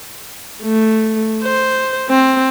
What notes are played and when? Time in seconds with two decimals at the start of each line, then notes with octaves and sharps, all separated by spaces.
0.63 A3
1.43 C5
2.09 C4